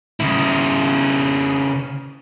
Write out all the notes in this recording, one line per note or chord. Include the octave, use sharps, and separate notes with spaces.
C#3 E4